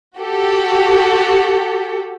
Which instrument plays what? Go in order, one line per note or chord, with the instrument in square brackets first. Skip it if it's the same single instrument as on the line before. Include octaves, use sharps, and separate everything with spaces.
[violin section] F#4 G4 A4